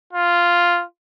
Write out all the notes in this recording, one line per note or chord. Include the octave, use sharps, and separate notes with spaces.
F4